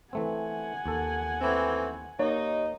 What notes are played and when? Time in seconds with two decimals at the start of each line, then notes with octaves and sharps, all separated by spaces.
0.13 E3 A3 C4 F#5 G#5
0.86 D#2 A4
1.41 E3 A3 C4
2.19 D#2 A#3 D#4 C#5